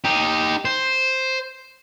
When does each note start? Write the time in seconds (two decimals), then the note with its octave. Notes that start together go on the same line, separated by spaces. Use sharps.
0.04 D#4 G4
0.65 C5